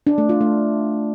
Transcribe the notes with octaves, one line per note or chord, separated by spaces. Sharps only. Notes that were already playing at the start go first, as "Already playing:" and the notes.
D4
A3
F4
A3